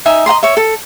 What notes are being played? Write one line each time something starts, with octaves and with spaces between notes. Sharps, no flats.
D#4 E5 G#5 A#5
D#5 F#5 A#5 C6
C#5 E5
A4